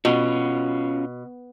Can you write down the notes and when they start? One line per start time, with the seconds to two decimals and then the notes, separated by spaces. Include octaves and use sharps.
0.05 B2 C#4 F4 F#4